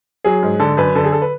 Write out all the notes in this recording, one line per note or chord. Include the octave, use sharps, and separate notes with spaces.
F#3 G#4
G#2
D3 A4
F#2 B4
D3 A4
G#4
A4
B4